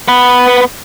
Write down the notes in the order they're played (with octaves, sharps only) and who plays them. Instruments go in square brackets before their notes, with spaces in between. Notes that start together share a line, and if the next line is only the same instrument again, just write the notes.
[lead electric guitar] B3 B4